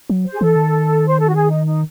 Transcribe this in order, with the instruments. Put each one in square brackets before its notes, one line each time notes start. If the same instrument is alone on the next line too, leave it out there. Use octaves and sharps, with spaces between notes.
[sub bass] F#3
[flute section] C5
G#4
[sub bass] E3 [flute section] A4
[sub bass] D#3
[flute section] C5
A4
F#4
G#4
D#4
D#4